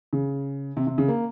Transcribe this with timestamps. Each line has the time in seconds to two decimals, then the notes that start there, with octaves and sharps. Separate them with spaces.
0.13 C#3
0.77 C3
0.87 C3
0.98 C#3
1.08 A#3